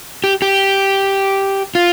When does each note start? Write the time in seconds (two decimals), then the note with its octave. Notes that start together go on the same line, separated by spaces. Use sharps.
0.24 G4
0.42 G4
1.75 F4